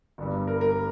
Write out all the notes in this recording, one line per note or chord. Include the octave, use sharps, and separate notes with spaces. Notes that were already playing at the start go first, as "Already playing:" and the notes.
G1 G2 G3
A#4
A#4